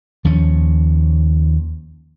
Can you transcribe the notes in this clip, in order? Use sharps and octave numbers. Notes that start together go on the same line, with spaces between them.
D#2 F3 C#4